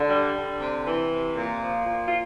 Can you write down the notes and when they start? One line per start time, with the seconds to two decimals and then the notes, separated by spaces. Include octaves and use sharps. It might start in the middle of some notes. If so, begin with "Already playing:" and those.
Already playing: D3
0.10 G3
0.35 D3
0.60 C3
0.86 E3
1.11 C3
1.36 A#2
1.61 F3
1.87 A#2
2.06 F4